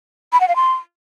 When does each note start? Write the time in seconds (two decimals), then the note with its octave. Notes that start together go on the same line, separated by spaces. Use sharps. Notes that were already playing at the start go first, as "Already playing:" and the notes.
0.33 B5
0.41 F#5
0.48 F5
0.56 C6